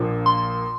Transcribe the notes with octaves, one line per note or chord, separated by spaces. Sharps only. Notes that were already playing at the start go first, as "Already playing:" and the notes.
Already playing: A#1 A#2 F3 A#3 D4
C6